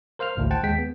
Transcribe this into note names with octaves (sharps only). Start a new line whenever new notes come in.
A#4 C5 F5 A#5 F6
A1 D2 A2
C5 F#5 G5 A5
D#2 G#3 G5 B6
B3